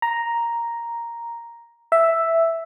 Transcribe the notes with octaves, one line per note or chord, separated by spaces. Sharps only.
A#5
E5